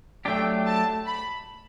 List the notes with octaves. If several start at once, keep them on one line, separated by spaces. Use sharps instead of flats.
F#3 A3 D4 G4 G5
A5
B5